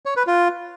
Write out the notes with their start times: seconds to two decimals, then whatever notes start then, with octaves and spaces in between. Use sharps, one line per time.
0.06 C#5
0.16 B4
0.27 F4